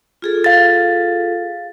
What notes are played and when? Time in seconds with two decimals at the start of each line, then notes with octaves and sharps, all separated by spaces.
0.22 F4 G#4 A4
0.44 F5 A6